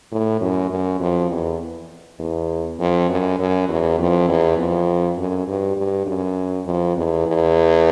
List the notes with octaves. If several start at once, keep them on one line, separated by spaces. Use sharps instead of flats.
A2
F#2
F#2
F2
E2
E2
F2
F#2
F#2
E2
F2
E2
F2
F#2
G2
G2
F#2
F2
E2
E2